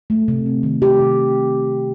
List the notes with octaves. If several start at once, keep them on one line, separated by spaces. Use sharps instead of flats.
A3
C3
C4
D#3
C3 G4
C3